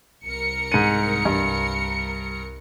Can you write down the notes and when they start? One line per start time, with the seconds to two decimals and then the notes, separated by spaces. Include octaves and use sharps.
0.24 C2 A#4 C#7
0.72 G#2 D#7
1.25 G2